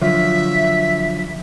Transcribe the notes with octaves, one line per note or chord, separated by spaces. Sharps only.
D3 F3 F#3 E5